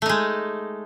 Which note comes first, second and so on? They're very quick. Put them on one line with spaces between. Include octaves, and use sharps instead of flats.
A3 D#4 G#3